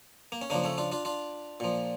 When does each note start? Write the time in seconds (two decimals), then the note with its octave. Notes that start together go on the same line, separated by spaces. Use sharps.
0.32 A#3
0.42 C#4
0.50 C#3 F3 A#3 D4
0.64 A3 C#4
0.78 D4 F4
0.92 D4 F4
1.05 D4 F4
1.60 A#2 F3